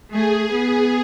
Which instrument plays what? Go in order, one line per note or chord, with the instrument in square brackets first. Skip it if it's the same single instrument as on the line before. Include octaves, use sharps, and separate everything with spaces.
[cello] A3 [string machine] G#4
[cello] B3